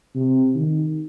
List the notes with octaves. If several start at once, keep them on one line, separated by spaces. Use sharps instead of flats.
C3
D#3